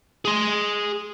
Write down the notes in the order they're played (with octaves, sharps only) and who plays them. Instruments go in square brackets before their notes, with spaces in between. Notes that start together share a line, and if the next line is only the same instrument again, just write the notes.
[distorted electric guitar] G#4 C6